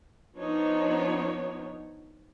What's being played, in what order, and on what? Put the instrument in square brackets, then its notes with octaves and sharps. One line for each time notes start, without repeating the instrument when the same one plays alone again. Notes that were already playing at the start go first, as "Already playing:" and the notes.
[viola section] F3 B3 D4 D#4 C#5